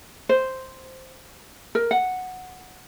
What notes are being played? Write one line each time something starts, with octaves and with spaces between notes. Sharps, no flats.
C5
A#4
F#5